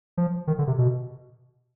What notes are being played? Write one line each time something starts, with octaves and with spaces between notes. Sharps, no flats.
F3
D#3
D3
C3
B2